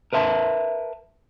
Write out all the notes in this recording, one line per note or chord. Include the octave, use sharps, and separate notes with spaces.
A#4 B4 E5 A5